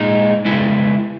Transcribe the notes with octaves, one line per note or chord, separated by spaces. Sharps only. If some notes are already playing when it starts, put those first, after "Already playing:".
Already playing: A#2 G#3 D#4
C#3 G#3 B3 E4